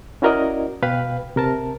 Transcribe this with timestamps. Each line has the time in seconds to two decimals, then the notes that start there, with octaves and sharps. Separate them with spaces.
0.22 C#4 E4 F#4 A#4 D5 D#5
0.82 B2 B4 F5 G5 B5
1.36 C3 A#4 A5